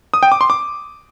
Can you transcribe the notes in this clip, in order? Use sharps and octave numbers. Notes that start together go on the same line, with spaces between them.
D#6
G5
D6
C6
D6